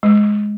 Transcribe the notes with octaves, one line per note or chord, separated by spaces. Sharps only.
G#3